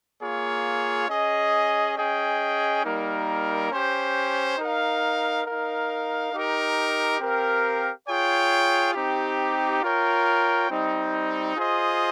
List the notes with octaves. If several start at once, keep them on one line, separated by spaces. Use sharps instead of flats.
A#3 F4 G#4 C#5
C#4 G#4 D#5
C#4 G#4 D#5 G5
G3 A#3 D#4 A#4
C#4 G4 C5
D#4 A#4 F5
D#4 A#4 F5
D#4 G4 A#4
C4 G4 A#4 F5
F4 G#4 C#5 G5
C4 D#4 G4
F4 A#4 C#5 G5
G3 C4 D#4
F4 G#4 C5 D#5